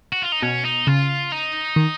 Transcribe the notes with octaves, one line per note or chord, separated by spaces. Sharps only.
F#4
F4
D#4
B2 C#4
D#4
C#3 F4
D#4
D#3